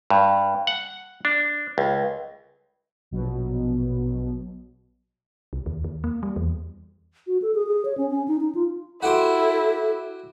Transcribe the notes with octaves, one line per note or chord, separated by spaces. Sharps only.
G2
F#5
D4
C#2
A#1 B2 F#3
C2
D#2
D#2
A#3
G3
E2
F#4
A4
G#4
G#4
C#5
C#4
C#4
D#4
D#4
F4
E4 F#4 G4 A4 C5